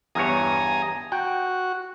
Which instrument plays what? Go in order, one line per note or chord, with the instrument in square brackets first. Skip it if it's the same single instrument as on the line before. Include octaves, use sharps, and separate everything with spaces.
[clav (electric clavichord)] E2 G2 C#5 [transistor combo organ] G#5 A#5 D#6
[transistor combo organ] F#4 [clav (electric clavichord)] G5